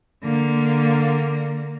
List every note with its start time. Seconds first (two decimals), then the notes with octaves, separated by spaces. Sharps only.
0.23 D3 A#3